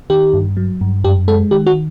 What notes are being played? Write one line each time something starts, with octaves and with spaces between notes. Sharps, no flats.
D#3 G4
G2
F#3
G2
F#2 G4
G#3 A4
D#3 G4
F#4